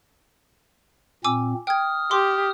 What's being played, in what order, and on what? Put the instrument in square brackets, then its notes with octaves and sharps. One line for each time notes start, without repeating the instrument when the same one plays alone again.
[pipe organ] A#2 C4 [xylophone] G#5 D6 E6
[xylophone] G5 G#6 [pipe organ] D#6 F6
[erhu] G4 [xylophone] C6 D6